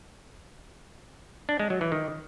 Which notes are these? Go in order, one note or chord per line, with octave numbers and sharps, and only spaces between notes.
D4
G#3
F#3
E3
D#3